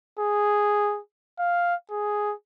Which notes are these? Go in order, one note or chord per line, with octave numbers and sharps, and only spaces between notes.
G#4
F5
G#4